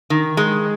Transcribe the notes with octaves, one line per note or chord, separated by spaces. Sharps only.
D#3
G#3